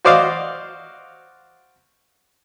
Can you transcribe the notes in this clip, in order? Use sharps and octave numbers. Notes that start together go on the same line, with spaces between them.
F#4 C5 D5 D#5 F5